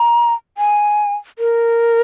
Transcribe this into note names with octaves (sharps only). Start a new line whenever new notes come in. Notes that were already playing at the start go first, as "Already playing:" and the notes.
Already playing: A#5
G#5
A#4